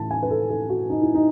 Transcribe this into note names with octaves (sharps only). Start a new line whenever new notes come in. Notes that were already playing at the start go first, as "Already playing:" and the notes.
Already playing: A2 E3 A3 A5
G#5
B4
A4
A4
F#4
D#4
E4
D#4